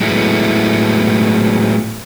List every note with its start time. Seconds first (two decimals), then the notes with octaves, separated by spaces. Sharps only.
0.01 A2 F#3 G#3 A3 B3 E4